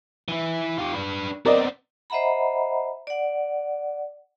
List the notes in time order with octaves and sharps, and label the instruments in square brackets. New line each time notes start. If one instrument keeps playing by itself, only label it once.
[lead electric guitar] E3 E4
F4 G4
D4 B4
[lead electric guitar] B3 C4 [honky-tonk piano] A#4 D5 D#5
[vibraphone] C5 D#5 E5 F#5 A#5 B5
D5 F#5